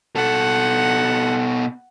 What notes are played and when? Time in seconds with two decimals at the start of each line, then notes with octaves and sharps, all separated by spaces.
0.16 B2 A4 F#5